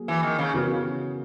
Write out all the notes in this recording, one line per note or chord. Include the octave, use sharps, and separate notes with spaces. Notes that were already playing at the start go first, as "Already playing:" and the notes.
Already playing: F#3 A#3 G#4
E3
D#3
C#3
C#3 E3 B3 F#4 A#4